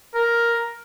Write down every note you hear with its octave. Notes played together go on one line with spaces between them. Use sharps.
A#4